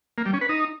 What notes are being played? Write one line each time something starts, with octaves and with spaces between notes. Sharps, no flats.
A#3
G3
C#4
B4
D#4